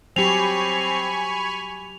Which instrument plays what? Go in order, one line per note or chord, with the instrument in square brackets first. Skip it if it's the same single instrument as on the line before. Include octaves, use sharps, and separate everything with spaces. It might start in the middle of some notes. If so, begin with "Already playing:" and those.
[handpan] F#3 G4 [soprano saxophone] C4 [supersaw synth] G#5 B5 C#6 [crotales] F7